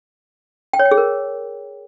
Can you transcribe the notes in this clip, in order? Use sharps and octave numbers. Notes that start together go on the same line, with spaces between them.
G5
C#5
G5
G#4
A#4